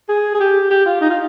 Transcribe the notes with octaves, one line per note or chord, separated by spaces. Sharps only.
G#4
G#4
G4
G4
F4
D#4
F4